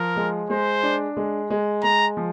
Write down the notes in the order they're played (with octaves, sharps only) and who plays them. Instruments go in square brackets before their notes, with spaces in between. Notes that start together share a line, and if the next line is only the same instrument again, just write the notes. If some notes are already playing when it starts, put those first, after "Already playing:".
Already playing: [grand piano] F3 [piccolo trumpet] A#4
[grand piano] G#3
[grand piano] G#3 [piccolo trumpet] C5
[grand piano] D4
G#3
G#3
[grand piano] G#3 [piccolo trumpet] A#5
[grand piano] F3